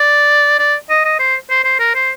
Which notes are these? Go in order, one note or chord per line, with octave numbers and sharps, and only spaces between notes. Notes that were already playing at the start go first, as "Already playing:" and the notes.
Already playing: D5
D5
D#5
D#5
C5
C5
C5
A#4
C5